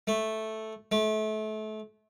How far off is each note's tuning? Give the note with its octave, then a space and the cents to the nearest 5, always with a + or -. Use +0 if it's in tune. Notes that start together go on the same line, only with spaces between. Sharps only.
A3 -5
A3 -30